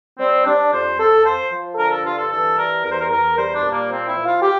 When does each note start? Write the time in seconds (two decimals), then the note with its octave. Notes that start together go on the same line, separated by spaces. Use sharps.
0.19 G3 C4
0.45 G3 D4
0.72 F2 C5
0.98 F2 A4
1.25 F3 C5
1.51 F3
1.74 A4
1.78 D3 A#4
1.91 A4
2.04 G2 F4
2.17 A4
2.31 E3 A4
2.57 G3 A#4
2.84 E2 A#4
2.91 C5
2.99 A#4
3.10 E2 A#4
3.36 G3 C5
3.54 D4
3.63 A#2
3.72 A#3
3.89 F3 C4
4.07 E4
4.16 F3
4.25 F4
4.42 G4